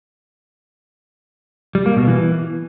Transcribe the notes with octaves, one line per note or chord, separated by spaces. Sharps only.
G3
A#3
B2
E3